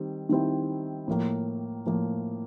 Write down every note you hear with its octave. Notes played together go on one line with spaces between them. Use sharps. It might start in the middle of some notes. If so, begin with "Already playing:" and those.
Already playing: D#3 G3 C4
D#3 G3 C4 E4
A2 F3 A#3
A2 F3 A#3